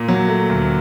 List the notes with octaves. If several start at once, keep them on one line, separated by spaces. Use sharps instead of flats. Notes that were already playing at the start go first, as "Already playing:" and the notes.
Already playing: A#2
F#3
A3
D2